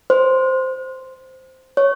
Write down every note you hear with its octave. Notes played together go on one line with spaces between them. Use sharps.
C5
C#5